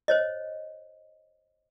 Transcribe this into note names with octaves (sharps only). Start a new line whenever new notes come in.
C5 C#5 D#5